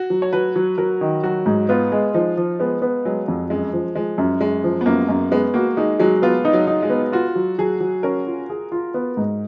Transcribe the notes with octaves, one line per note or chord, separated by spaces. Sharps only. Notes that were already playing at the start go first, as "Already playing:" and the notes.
Already playing: F#4
F#3
C#5
F#3 B4
F#3
F#3 A#4
D#3
F#3 F#4
G#2
B3 F4
G#3
F3 D#4
F3
G#3 B3
B3
F#3 G#3
F2
F#2 G#3
F3
F3 G#3
F#2
F#2 G#3
F3
B3
F#2 A#3
F#2
G#3 B3
A#3 F#4
G#3 D#4
F#3 G#3
B3 F4
D#4
F#3
D#4
G#3
B3
F4 F#4
F#3
F#3 G#4
F#3
C#4 A#4
F4
G#4
F4
B3
G#2